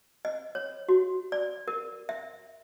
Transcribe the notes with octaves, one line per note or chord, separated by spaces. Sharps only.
D#5
C#5
F#4
D5
A#4
E5